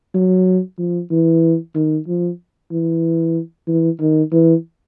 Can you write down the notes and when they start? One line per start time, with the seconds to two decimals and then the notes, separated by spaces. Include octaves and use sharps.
0.15 F#3
0.78 F3
1.11 E3
1.75 D#3
2.07 F3
2.71 E3
3.67 E3
4.00 D#3
4.32 E3